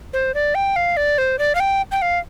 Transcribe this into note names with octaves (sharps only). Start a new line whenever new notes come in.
C5
D5
G5
F5
D5
C5
D5
F5
G5
G5
F5